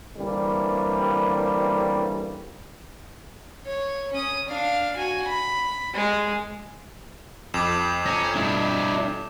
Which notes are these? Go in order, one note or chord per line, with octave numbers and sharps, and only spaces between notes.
D3 E3 G3 A#3 C4 C#4
C#5
C#4 D#6
D4 F5
F#4 G#5
B5
G#3
F2 D6 E7
C#4 G#5 A#5 A#6
G2 B2 D4 E4